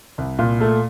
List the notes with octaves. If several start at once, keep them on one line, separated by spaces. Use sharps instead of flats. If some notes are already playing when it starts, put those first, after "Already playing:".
C2
A#2
A3